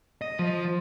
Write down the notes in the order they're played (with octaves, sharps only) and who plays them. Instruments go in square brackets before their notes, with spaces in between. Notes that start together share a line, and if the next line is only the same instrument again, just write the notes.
[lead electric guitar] D#5
F3